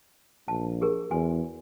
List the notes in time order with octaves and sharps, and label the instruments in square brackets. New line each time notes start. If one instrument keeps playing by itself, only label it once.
[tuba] A#1 [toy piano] A5
[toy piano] G4 G#4 A#4
[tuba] E2 [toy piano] F#4 G#5 C6